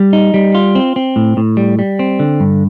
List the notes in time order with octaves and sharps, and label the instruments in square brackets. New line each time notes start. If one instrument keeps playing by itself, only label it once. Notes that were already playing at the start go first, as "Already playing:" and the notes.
Already playing: [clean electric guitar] G3
D#4
G3
F4
C4
C4
A2
A2
G3
G3
C4
D3
G2